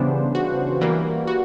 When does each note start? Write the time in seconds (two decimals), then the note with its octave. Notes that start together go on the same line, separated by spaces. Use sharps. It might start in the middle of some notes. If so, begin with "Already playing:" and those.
Already playing: C#3 E3 G3 B3 D4 C5
0.35 F#4
0.81 E3 G3 A#3
1.27 F#4